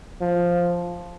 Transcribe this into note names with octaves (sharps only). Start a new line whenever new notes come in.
F3